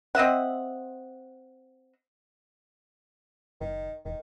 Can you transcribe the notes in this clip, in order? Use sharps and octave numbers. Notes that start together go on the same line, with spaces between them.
C4 D#5 E5 F#5
F#1 D#3
E1 D#3